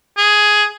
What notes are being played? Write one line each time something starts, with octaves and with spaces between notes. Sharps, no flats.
G#4